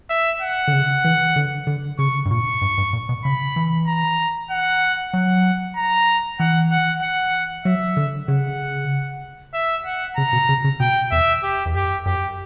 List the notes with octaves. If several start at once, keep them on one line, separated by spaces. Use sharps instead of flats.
E5
F#5
D3
C#3
E3
D3
D3
C#3 C#6
G2
A#2 C#6
G2
G2
A#2
B2
C#3 B5
E3
A#5
F#5
F#3 F#5
A#5
E3 F#5
F#5
F#5
F#3 E5
D3
C#3 F#5
E5
F#5
C#3 A#5
B2
C#3
C#3
B2 G5
E2 E5
G4
E2
F#2 G4
F#2 G4